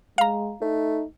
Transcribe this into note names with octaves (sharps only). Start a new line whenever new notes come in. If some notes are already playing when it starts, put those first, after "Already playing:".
G#3 F5 A#5
A3 D#4